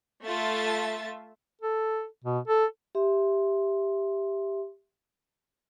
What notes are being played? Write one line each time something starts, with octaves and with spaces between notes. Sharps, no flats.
A3 F4 E5 A5 A6
A4
B2
A4
G4 E5 C6